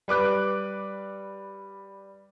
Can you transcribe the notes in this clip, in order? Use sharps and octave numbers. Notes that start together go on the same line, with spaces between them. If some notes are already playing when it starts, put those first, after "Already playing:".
G3 B4 D6 F#6